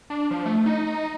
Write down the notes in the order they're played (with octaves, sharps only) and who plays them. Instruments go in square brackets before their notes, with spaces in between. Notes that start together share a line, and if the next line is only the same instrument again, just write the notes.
[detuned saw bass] D4
F3
A3
D#4